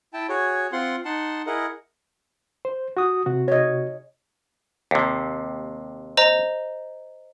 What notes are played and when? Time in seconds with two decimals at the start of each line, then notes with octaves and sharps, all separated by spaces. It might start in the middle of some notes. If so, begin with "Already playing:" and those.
0.13 E4 G5 A5
0.29 F#4 G#4 C#5
0.72 C4 F4 F#5 C6
1.05 D#4 F#5 A5 C6
1.47 E4 G#4 A#4 D#5 F#5
2.65 C5
2.97 F#4 D#6
3.26 C3 F#4
3.48 C#5 D#5
4.91 D#2 C3
6.17 C5 D#5 A#5